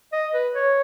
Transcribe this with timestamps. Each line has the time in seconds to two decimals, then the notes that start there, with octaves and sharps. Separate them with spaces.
0.13 D#5
0.33 B4
0.54 C#5